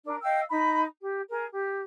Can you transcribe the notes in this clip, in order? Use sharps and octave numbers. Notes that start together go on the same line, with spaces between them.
D4 A#4
D#5 F5 G5 E6
D#4 B5
G4
G#4 A#4
G4